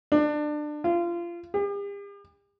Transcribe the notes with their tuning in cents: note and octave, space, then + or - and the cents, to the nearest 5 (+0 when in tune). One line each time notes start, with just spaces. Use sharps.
D4 +25
F4 -25
G4 +45